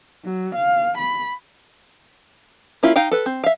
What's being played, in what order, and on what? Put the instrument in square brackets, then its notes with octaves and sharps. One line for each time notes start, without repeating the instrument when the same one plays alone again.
[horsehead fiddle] F#3
F5
B5
[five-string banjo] A#3 C#4 E4 F4
D#4 F5 G5
A4 B4
C4
E5 F5